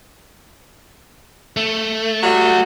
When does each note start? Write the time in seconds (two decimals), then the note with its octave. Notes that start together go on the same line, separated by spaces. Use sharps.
1.56 A3
2.23 F#3 G3 F#4